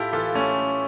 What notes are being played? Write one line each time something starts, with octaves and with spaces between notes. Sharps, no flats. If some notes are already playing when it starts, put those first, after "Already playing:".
Already playing: A2 E4 F4 G4 A4
E3 F4 A4
A3 C#4